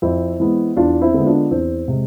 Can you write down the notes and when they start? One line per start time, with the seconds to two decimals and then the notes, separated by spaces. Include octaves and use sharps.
0.02 F2 C4 E4
0.40 E3 G#3 B3
0.77 E2 D4 F4
1.02 C4 E4
1.14 D3 G#3 B3
1.26 D4 F4
1.51 E2 C4
1.88 C3 G#3